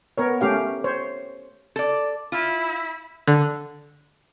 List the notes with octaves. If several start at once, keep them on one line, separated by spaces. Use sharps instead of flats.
B3 A#4 C#5
A3 C#4 G4 F5
C5 C#5
A4 D5
E4 F4
D3